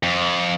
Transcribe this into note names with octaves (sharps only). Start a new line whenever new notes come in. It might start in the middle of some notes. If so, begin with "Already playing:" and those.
F2